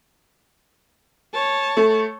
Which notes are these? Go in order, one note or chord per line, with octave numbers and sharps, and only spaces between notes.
C#5 A5
A3